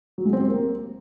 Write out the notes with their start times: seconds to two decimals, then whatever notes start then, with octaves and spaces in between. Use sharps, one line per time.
0.18 F#3
0.25 G#3
0.33 C4
0.41 G4
0.48 A#3